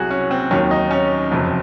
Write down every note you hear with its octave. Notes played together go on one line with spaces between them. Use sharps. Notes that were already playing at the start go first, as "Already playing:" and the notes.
Already playing: C2 C3 F#3 F#4 G#4
C#4
C4
D#2 D#3 F#3 C#4
D#4
C#4
F#1 F2 C3 F#3